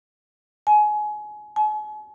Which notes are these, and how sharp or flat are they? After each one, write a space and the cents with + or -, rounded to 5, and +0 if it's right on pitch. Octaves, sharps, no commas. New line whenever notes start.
G#5 +25
G#5 +45